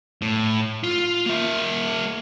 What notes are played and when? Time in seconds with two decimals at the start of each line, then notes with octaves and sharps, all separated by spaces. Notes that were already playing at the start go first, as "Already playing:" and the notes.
0.22 A2
0.84 F4
1.26 A#3 E5